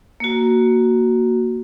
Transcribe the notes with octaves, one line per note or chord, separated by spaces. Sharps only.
A#3 F#4